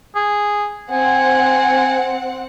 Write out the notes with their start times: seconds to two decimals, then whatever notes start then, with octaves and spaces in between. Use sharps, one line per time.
0.15 G#4
0.92 C4 F#5 G#5